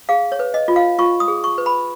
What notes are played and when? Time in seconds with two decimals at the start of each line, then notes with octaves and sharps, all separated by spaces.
0.09 G#4 F5
0.32 C#5
0.39 B4
0.54 D#5
0.68 F4
0.76 F5
0.98 F4 C#6
1.20 D#6
1.28 G#4
1.44 C#6
1.58 B4
1.66 B5